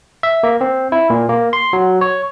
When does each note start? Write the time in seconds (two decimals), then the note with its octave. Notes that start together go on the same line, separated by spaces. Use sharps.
0.23 E5
0.43 A#3
0.61 C4
0.92 E4
1.10 A#2
1.29 A#3
1.53 C6
1.73 F#3
2.01 C#5